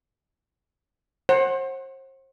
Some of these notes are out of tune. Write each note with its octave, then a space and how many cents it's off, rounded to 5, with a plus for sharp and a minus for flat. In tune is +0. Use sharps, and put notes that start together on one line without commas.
C5 +35 F#5 +0